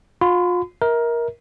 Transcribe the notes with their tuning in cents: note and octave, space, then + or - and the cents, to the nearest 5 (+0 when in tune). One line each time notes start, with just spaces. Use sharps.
F4 +35 B5 +45
A#4 +15 E5 -40